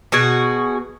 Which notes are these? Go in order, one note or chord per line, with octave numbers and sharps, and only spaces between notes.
B2 F#4 G#4